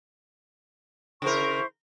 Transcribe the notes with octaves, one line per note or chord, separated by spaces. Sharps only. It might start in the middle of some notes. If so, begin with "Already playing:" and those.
C#3 E4 A#4 C5 C#6